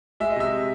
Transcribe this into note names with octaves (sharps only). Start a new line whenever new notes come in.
G#3 E5
D#5
C3 E5